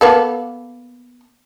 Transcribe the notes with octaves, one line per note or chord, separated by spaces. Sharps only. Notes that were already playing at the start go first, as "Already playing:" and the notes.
A#3 B3 A4